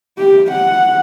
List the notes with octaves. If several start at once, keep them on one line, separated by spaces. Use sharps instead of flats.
G4
F#5